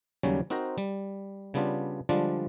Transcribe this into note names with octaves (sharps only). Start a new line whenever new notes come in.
D#2 C#3 F#3 G3 C#4
C4 D#4 F#4 A#4 C5 A#5
G3
C#3 G3 B3 D4 F4
D3 F3 G3 G#3 D4 F4